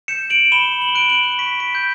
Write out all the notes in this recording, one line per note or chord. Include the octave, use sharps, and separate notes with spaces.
G6 C#7 E7
D7 F#7
B5 E7 G7
F#7
G7
F#6 D7 F#7
D7 F#7
C#6 B6 D7
B6 D7
G6